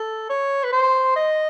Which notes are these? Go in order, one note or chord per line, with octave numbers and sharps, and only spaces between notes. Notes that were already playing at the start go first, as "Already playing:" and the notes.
Already playing: A4
C#5
B4
C5
D#5